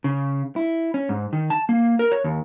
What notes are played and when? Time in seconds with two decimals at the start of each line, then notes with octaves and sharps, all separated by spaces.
0.04 C#3
0.56 E4
0.94 C#4
1.09 G#2
1.33 D#3
1.50 A5
1.69 A#3
1.99 A#4
2.12 C#5
2.24 D#2